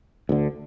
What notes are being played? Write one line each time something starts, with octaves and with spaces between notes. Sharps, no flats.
D2 D3